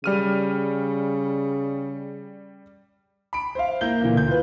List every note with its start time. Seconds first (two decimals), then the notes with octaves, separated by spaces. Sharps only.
0.04 C#3 G3 F6 D#7
3.33 B5 D7
3.55 C5 E5 F5
3.81 A#3 E4 G6 G7
4.01 A#2 D3 E3 A#3
4.15 D2 G6
4.27 F4 B4